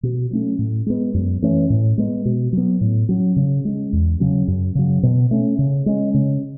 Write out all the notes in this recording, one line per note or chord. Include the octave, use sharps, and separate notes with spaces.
B2
F#3 A3 C#4
A2
G#3 B3
F#2
E3 A3 C#4
A2
G#3 B3
B2
F#3 B3
A2
F#3 C#4
C#3
G#3 C#4
E2
C#3 F#3 C#4
F#2
C#3 F#3
B2
A3 C#4
C#3
G#3 C#4
C#3